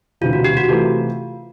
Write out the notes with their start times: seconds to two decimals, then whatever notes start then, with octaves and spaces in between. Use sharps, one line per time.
0.21 E1 D2 C3 E3 F4
0.33 F#4
0.44 G4
0.57 F#4
0.68 C3 E3 A3 F4